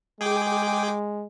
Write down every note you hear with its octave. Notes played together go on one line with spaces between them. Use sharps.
G#3 G#4 G5 D6